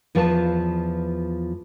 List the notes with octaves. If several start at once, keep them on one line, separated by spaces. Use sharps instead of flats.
E2 F3 F4 B4 G#5 A5